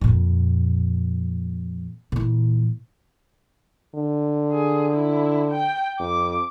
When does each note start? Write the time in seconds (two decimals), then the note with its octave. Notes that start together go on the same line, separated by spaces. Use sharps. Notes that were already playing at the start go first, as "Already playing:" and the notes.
0.01 F2 A#2
2.12 A#2 E3
3.95 D3
4.52 G#4
4.94 E4
5.50 G5
5.99 F2 D6